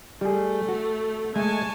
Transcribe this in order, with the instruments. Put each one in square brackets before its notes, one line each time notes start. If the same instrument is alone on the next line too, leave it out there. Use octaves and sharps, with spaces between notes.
[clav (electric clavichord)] G3 G#4 [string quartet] A3
[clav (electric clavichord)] F#4
[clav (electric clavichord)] G#3 A3 D#5 [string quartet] G#5 A5 C#6